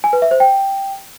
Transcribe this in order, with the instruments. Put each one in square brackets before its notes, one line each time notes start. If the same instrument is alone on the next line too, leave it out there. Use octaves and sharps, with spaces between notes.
[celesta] G#5
B4
E5
C5
G5